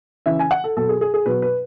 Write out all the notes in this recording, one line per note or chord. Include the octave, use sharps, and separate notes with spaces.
C#3 E3 E5
G#5
F#5
A4
B2 F#3 A4
G#4
G#4
G#4
B2 F#3 B4
B4